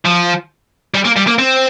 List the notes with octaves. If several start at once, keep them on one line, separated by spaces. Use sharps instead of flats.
F3
G3
A#3
G3
A#3
C4